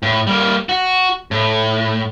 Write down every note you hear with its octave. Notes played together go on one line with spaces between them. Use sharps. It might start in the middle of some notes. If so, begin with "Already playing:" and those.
A2
G3 A#3
F#4
A2